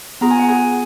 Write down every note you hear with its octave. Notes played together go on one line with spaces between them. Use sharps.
B3 F4 G#4 A#5
G#5
F#5
G#4 G#5